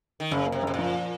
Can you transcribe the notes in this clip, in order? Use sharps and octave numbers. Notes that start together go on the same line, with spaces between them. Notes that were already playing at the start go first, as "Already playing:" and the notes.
D#3
F#1 C#3
A#3
C3
F#1 C3
A#2
F3